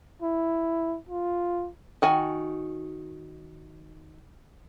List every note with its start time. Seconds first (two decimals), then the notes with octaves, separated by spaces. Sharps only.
0.22 E4
1.09 F4
2.02 D#3 F#4 G#5